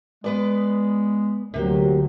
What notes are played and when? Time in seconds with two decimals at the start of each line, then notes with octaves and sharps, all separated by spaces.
0.24 G#3 B3 B4 D5
1.54 D2 C3 F#3 A#3 G4